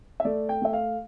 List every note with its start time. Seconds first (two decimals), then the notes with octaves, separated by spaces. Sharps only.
0.20 E5
0.25 A3 D5
0.49 G5
0.62 A3 E5
0.73 F5